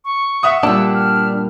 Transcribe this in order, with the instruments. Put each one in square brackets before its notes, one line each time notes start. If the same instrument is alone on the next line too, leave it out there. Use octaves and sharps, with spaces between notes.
[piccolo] C#6
[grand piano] E5 F#5 D#6
[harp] G2 A#2 [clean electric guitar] D4 [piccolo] E6
[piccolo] F6